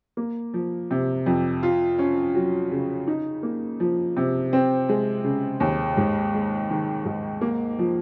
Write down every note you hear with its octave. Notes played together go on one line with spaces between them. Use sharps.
A#3
F3
C3
F2
F4
C#4
F#3
C#3
D#4
A#3
F3
C3
C4
G#3
C#3
D#2
G#2
G#3
D#3
G#2
A#3
F3